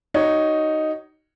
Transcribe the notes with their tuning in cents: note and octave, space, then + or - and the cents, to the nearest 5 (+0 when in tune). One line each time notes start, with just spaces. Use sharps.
D#4 +0 F#4 +45 C#5 +0